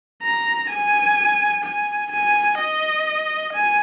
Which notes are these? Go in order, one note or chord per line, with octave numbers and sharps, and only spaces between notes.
A#5
G#5
G#5
G#5
D#5
G#5